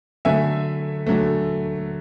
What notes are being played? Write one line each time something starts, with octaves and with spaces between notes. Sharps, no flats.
D3 F#3 A3 E5 G#5
D3 F#3 A3